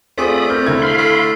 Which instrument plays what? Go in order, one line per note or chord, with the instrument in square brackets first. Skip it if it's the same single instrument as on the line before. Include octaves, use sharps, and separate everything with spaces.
[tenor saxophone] A3 [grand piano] C4 F4 G#4 [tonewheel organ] D5 B5 D#6
[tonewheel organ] C4 A#4 [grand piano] G6
[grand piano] D3 E4 G#6
[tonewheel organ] F5 B5 C6
[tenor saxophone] A3